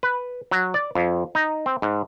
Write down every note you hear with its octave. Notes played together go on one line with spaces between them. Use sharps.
B4
F#3
D5
F2
D#4
C4
G#2